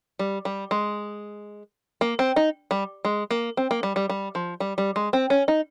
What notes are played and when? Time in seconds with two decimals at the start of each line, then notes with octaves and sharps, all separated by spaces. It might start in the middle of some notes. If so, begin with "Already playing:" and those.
0.19 G3
0.45 G3
0.71 G#3
2.01 A#3
2.19 C4
2.36 D#4
2.71 G3
3.05 G#3
3.31 A#3
3.57 C4
3.71 A#3
3.83 G3
3.96 G3
4.09 G3
4.35 F3
4.60 G3
4.78 G3
4.96 G#3
5.13 C4
5.30 C#4
5.48 D#4